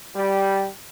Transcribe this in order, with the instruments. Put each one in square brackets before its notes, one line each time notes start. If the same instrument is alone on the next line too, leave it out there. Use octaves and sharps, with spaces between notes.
[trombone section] G3